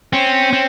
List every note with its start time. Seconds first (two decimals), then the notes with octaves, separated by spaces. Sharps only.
0.13 C4 C#4
0.53 C4